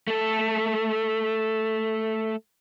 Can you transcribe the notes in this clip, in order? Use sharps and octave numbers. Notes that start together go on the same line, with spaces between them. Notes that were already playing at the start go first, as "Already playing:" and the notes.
A3 A4